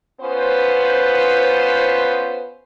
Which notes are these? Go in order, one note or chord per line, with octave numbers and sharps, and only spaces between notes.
B3 C#4 F4 B4 C5